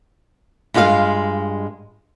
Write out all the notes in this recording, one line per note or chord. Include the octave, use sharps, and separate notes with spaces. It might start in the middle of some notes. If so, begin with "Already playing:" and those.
G2 G#3 F4 G4 F5